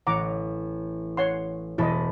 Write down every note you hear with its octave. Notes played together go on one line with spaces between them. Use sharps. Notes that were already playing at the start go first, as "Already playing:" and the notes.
A1 F#5 A#5 D6
C#5 F#5 C6
E1 E4 D#5 A5 B5